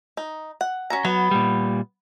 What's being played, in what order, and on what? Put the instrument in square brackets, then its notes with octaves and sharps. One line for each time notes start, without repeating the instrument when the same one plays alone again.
[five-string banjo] D#4
F#5
C#4 F#4 A#5
[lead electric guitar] F#3 [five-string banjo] B3
[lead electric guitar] A#2 G3